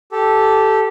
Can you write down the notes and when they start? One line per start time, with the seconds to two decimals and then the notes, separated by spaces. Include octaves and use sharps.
0.12 G4 A4